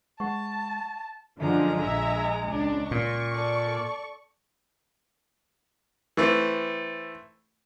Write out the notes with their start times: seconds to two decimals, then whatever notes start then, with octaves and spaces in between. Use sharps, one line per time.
0.20 G#3 F#5 A5 C#6
1.40 F#2 D3 F3 G#3 A#5
1.82 A#1 E5
2.45 C#2 D4
2.91 A#2 C#6
3.34 A4 D5
6.17 E3 A3 C4